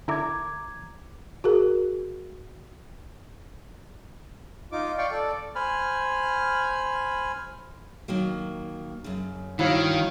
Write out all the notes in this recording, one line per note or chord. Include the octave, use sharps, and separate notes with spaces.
D3 E4 A#4 A#5 D6 G#6
F#4 G#4 A#4
D#4 F4 D6
D5 F5 G5 C#6
A4 D5
C5 G#5 B5 F6
D#3 F#3 A#3
F#2 C#3
G2 D#3 E4 F#4 C#5 F5